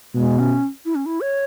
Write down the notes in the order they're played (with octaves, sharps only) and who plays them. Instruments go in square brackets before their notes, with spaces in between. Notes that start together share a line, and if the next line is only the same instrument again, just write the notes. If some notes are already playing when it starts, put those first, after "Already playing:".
[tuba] B2 [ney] G#3
[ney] C#4
E4
C#4
E4
C#5